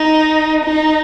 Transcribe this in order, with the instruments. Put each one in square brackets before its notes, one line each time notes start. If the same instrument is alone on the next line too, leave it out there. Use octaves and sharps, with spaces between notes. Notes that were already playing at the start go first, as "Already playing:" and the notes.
Already playing: [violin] D#4
D#4